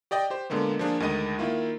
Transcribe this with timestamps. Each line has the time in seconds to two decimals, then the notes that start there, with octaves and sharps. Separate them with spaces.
0.11 G4 D5 D#5 G5
0.30 G4 C5
0.50 A#2 D3 G#3 A#3 B3
0.79 F3 A#3 D4 F4 G#4
1.00 D2 D#3 G#3 D#5 D#7
1.39 D#3 A#3 E4 F4